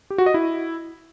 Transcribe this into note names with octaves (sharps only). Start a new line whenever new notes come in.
G4
F#4
D#5
E4